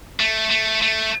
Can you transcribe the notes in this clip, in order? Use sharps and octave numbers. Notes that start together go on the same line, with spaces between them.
A3
A3
A3